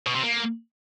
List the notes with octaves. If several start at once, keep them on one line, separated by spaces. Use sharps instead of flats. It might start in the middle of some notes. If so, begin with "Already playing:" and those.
B2
C3
A#3